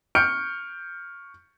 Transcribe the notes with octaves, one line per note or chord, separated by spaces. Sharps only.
C#6 F6 G6 C#7 D7